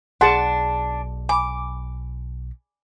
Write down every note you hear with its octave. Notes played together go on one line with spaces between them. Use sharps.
B1 D4 G#4 F#5 A5 C6
G#5 B5 D6